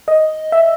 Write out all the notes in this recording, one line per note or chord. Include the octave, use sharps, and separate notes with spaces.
D#5
E5